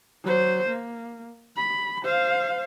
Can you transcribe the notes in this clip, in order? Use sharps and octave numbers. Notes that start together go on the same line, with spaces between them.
F#3 C5
A#3
B5
C5 F5